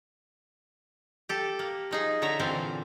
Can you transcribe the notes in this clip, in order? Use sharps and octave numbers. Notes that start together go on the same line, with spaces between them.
G4 A4
A#3
F3 D#4 G#4
D3 C#5 E5 A#5
A#2 D3 E3 C4 C5